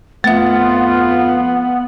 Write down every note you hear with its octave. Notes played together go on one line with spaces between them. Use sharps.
F2 A3 B3 F4 E5